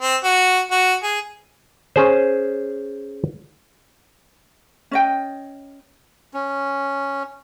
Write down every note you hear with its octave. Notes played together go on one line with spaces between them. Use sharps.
C4
F#4
F#4
G#4
C#4 G#4 C5
C#4 D#5 G5
C#4